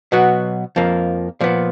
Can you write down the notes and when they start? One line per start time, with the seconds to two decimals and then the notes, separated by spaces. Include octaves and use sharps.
0.12 B2 F#3 B3 F#4
0.76 F2 F3 A#3
1.41 A#2 F3 B3